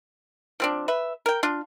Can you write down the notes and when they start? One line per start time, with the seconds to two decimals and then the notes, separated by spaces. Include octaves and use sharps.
0.60 F3 C4 D4
0.88 B4 E5
1.26 A#4 G5
1.43 D4 F4